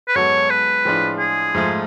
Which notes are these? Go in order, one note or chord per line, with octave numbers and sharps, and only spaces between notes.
B4
G#2 F#3 B3 F#4 A4 C#5
B4
A2 F3 G#3 D4 F4
G#4
G#2 F3 A3 F4